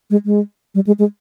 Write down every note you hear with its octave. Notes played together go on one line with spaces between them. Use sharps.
G#3
G#3
G3
G#3
G#3